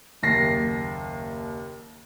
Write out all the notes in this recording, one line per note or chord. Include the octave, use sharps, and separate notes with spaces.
F#1 D#2 A#6 C7